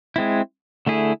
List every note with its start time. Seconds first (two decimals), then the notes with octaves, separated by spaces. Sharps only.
0.16 G#3 C4 E4
0.87 D3 A3 E4 G#4